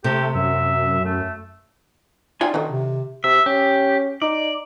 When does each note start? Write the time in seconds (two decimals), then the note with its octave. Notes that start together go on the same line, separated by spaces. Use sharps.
0.04 C3 A3 G4
0.35 F#2 E5
1.05 A3
2.41 D#4 F4 D5 G5 G#5
2.54 D3 D#3 F#3 D#4
2.71 C3
3.24 C3 E5
3.46 C#4 G4
4.22 D#4 D5